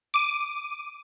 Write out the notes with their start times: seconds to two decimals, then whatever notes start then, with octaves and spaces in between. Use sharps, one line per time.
0.14 D6 D#7